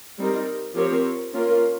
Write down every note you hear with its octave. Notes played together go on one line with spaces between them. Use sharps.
G3 C4 D#4 A#4
F3 C4 G4 A#4 C#5
A#3 C#4 F4 A#4